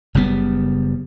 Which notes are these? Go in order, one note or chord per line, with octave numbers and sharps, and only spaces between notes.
F#1 C#3 G3 B3